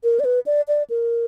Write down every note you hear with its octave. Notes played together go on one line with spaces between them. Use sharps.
A#4
D5
B4
D5
D5
A#4